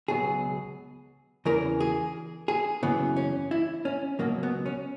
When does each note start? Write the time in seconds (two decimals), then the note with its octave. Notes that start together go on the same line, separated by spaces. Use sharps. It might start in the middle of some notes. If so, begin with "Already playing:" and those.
0.08 C#2 B2 F#3 G#4
1.45 E2 C#3 E3 A#4
1.80 G#4
2.48 G#4
2.83 F#2 C#3 E3 B3
3.17 C#4
3.51 E4
3.85 C#4
4.19 C#2 B2 F#3 A#3
4.43 B3
4.66 C#4